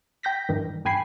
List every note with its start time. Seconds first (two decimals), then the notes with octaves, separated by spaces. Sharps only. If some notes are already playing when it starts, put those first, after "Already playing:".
0.23 G5 G6 A#6 B6
0.49 G2 D#3 E3
0.85 G2 G5 G#5 B5 C7